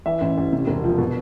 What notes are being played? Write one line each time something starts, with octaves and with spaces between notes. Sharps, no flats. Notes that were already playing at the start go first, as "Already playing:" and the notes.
E3 E5
A1
A1
C3
E1
F3
B2